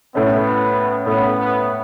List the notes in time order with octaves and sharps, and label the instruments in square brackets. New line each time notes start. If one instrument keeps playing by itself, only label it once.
[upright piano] A2 A3 C#4 [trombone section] B3
[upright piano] A2 A3 C#4 [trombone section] B3
[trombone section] B3